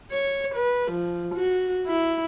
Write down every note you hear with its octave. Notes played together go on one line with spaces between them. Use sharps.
C#5
B4
F3
F#4
E4